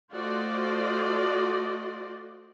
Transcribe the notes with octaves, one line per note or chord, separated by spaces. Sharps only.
A3 F4 F#4 C5 D5 D#5